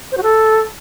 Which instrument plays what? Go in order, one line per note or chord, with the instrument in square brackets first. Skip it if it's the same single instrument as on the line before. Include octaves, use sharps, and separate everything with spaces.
[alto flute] C5
F#4
A4